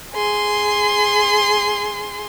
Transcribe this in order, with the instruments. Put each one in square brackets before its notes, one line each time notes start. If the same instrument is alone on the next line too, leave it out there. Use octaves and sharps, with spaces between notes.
[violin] G#4 C6